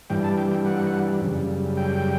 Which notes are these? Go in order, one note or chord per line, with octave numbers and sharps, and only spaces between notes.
G2 E3 G3 G5
A5
G5
G5
F#5
F#2 C#3 G3
G5